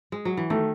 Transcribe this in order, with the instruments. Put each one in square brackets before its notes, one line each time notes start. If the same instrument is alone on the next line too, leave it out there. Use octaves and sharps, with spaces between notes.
[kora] G#3
F#3
E3
[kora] D#3 [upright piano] A3